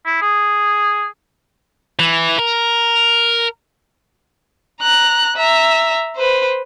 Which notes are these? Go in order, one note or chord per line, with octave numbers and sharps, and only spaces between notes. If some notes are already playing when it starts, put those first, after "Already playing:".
E4
G#4
E3
A#4
A#5 F#6
E5 A#5
B4 C5